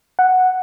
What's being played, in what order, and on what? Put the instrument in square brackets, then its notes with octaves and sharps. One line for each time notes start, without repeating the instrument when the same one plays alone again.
[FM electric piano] F#5